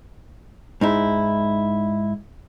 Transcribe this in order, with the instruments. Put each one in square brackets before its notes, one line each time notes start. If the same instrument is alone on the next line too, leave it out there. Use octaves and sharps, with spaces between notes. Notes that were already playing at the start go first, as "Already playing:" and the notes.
[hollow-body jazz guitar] G#2 D#4 E4